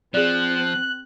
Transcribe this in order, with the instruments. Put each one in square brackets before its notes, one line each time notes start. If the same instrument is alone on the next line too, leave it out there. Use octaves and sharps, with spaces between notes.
[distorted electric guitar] F3 [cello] C4 [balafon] G#4 D5 [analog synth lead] F#6